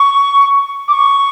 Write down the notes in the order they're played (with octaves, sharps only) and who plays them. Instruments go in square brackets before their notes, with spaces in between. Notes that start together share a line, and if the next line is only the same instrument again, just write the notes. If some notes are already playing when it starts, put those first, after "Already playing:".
Already playing: [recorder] C#6
D6
C#6